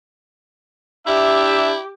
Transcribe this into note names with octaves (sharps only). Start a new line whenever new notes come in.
D4 E4 G4 E5